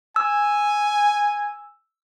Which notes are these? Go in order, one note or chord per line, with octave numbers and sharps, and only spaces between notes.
G#5 E6